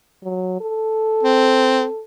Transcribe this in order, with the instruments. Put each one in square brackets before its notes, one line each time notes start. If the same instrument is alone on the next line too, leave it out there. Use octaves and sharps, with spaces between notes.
[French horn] F#3
A4
[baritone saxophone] C4